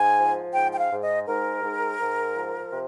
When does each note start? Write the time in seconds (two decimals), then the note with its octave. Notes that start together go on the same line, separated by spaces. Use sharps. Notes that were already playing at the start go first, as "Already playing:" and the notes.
Already playing: G#2 G#5
0.18 F3
0.53 G#2 G5
0.72 G5
0.78 F5
0.91 G#2
1.02 D#5
1.26 G#2 A#4
1.62 G#2
1.99 G#2
2.34 F3
2.71 C3